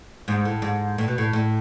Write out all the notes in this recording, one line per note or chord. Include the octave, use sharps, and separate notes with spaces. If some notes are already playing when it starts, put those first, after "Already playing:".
G#2
A2
G#2
A2
B2
A2
A2